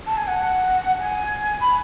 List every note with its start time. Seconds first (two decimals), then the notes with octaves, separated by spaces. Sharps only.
0.07 A5
0.17 G#5
0.27 F#5
0.99 G#5
1.61 B5